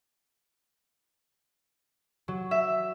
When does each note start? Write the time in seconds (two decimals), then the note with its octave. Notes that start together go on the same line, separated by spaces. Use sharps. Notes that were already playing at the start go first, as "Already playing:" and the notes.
2.28 F#3
2.51 E5